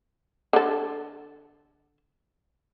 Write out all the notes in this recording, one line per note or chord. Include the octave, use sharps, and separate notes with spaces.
D3 A4